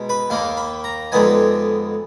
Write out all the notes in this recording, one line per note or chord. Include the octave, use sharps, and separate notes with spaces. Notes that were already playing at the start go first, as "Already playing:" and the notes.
Already playing: B2 G#3 D#4
B4
D#2 D#3 A#3 F5
B5
A#5
F2 D3 G#3 B3 D#4 G#5